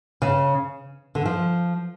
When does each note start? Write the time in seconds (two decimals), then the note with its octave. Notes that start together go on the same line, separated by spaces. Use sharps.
0.22 C#3
1.15 D3
1.25 F3